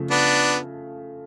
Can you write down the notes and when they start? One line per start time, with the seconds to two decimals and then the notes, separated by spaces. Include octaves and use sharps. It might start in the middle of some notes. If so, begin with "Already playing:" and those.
Already playing: C#3 F3 A3
0.11 B3 D4